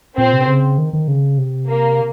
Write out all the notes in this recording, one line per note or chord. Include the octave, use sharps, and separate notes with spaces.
A#2 C4
C3
C#3
D#3
D#3
C#3
C3
A#3